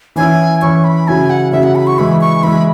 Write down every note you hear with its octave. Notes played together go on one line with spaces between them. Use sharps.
E3 C#4 E4 G#5
E3 C#4 E4 C#6
B5
C#3 F#3 E4 G#5
F#5
C#3 F#3 E4 E5
F#5
B5
C#6
E3 G#3 E4 B5
C#6
E3 G#3 E4 B5